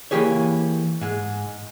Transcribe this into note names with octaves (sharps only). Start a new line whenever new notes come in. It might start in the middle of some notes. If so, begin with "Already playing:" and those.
E3 A#3 G4 G#4 C#5
G#2 G#3